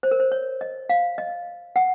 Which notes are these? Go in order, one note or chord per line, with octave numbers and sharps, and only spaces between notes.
C5
A#4
C5
C#5
D#5
F5
D#5
F#5